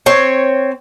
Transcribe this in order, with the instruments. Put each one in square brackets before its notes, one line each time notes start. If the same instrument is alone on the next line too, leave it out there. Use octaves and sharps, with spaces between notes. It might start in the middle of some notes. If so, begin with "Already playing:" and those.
[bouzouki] C4 C#5